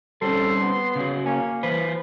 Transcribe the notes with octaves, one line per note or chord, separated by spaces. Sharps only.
G3 C4 C#4 A4 C6
B3
C#3 F#3
A#3 C#4
E3 B4 C5